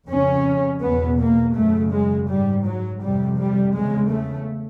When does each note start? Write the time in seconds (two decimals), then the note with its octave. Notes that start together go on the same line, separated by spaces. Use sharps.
0.10 F2 C#3 C#4
0.83 E2 B2 B3
1.20 A#3
1.56 F#2 C#3 A3
1.93 G#3
2.30 G#2 G3
2.66 F#3
3.03 F2 C3 G3
3.40 G3
3.76 E2 C#3 G#3
4.12 A3